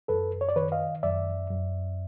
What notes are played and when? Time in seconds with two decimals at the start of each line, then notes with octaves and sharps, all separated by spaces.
0.08 F#2 A4 B4
0.41 C#5
0.49 D5
0.56 D#3 B4 C#5
0.72 D#5 F5
1.03 F#2 D5 E5
1.50 F#2